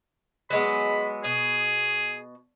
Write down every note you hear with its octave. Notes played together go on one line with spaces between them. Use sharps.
F#3 G#3 B3 B5
B2 G#4